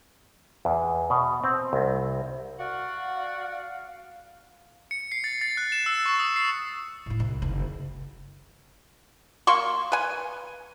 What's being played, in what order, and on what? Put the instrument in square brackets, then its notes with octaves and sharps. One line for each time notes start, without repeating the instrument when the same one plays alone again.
[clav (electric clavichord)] E2
B2
C4
C2
[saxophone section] F#4 D5 F#5 [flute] F5
[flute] F5
[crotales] C#7
C7
A6
A6
F#6
E7
E6
C#6
D#6
C7
[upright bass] A2 E4
C2 F2
F#1 D#3
[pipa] A#3 C6 C#6
B4 G#5